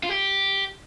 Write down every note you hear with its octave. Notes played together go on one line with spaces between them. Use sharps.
F4
G4